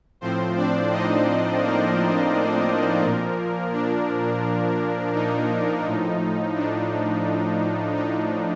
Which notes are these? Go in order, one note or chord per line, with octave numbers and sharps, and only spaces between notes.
A2 F3 C4 C5
D4 D5
D#4 D#5
A#3 A#4
A#2 F3
D4
D#4
A2 F3
D4
D#4